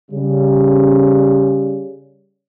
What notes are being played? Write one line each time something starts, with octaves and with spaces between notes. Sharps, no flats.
C#3 G3